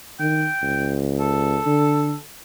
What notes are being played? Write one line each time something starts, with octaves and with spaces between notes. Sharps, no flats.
D#3 G5
C#2
A4
D3